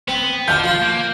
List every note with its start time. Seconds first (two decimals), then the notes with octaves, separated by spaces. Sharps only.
0.08 B3 C4
0.48 D3 F3 F5 G6
0.64 F4 C6
0.82 A#3